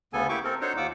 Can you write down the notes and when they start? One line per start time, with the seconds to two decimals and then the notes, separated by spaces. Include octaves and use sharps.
0.13 D2 C#3 B3 A4 G#5
0.29 A#3 E4 G4 C#6 D6
0.44 C4 A4 A#4
0.61 D4 D#4 F#4 A4 C5 C#5
0.77 D#2 F4 F#5 D6 E6